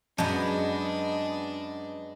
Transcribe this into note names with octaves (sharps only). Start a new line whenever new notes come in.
F#2 G#3 B3 D4 D#5 A5 G6